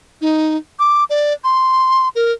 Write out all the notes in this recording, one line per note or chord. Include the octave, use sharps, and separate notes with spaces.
D#4
D6
D5
C6
A#4